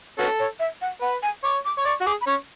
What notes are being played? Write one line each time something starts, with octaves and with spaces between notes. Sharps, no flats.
C#4 F#4 A4 B4
C#5
E5
F#5
B4 F#5
G#5
C#5 D6
D6
C#5
D5 C#6
F#4
G#4 D6
B5
C#4 C#6